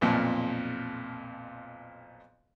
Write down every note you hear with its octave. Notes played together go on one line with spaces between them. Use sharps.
B1 F2 A#2 F3